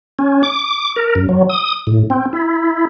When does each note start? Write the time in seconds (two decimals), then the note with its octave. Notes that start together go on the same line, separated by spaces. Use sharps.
0.19 C#4
0.43 D6
0.96 A#4
1.15 F#2
1.29 F#3
1.49 D#6
1.87 A2
2.10 C4
2.33 E4